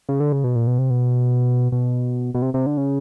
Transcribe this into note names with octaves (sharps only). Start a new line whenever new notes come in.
C#3
D3
C#3
B2
A#2
B2
C3
B2
B2
B2
C3
C3
D3
C#3